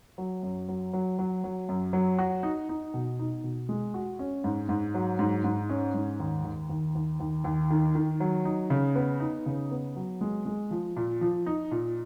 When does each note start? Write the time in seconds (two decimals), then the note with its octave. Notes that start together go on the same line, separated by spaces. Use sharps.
0.18 F#3
0.43 F#2
0.69 F#3
0.93 F#3
1.19 F#3
1.44 F#3
1.69 F#2
1.93 F#3
2.19 F#4
2.43 D#4
2.69 D#4
2.94 B2
3.19 D#4
3.44 B2
3.69 G#3
3.94 F#4
4.19 C#4
4.44 G#2
4.69 G#2
4.94 F#3
5.19 G#2
5.44 G#2
5.70 C#4
5.94 G#2
6.20 D#2
6.44 D#2
6.70 D#2
6.95 D#2
7.20 D#2
7.44 D#2
7.70 D#3
7.95 D#3
8.20 F#3
8.45 D#4
8.70 C#3
8.95 B3
9.20 D#4
9.46 C#3
9.71 B3
9.96 F#3
10.21 G#3
10.46 G#3
10.71 F3
10.97 A#2
11.21 F3
11.46 D#4
11.71 A#2